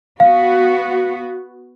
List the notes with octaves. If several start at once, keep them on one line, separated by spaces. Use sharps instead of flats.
B3 F#4 F5